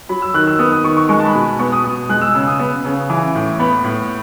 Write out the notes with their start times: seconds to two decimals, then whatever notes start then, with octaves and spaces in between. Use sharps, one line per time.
0.09 F#3 B5
0.22 E6
0.34 D#3 F#6
0.47 E6
0.59 B3 D#6
0.72 D#6
0.84 D#3 C#6
0.97 C#6
1.09 G#3 C#6
1.19 A5
1.26 B5
1.34 B2
1.59 B3 C#6
1.72 D#6
1.84 B2 D#6
2.09 G#3 F#6
2.21 E6
2.34 C#3 E6
2.47 D#6
2.59 B3
2.85 C#3
3.10 E3
3.35 A2
3.60 B3 B5
3.84 A2